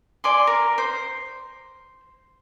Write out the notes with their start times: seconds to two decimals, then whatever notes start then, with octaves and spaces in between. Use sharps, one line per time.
0.24 D5 G#5 C6
0.47 A#4
0.78 C5